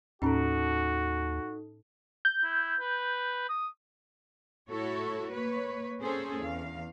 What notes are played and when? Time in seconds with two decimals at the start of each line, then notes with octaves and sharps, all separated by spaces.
0.22 D#2 A2 C#4 D#4 F#4 A4 A#5
2.25 G6
2.44 E4
2.80 B4
3.49 D#6
4.70 A2 E4 F#4 A4 C#5
5.32 A#3 B4 C#5
6.01 A#3 C4 C#4 G#4 A4 C5
6.40 E2 F5